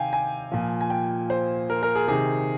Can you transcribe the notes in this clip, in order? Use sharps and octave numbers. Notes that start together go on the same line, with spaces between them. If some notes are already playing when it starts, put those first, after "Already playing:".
Already playing: C3 D#3 F5 G5 G#5
G#5
A#2 F3
G#5
G5
C5
A#4
A#4
G#4
C3 D#3 G#4